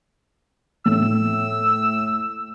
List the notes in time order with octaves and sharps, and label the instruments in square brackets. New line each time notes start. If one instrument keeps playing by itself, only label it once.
[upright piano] A2 [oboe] E6